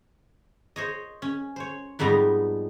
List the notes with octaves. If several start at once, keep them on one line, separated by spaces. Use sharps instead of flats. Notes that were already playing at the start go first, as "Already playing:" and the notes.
C5 C#5 D#5
C#4
C5 C#5
F2 G#2 G3 B3 D#4 A#5